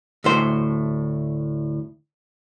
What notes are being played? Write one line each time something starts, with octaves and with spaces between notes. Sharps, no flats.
D2 A2 C5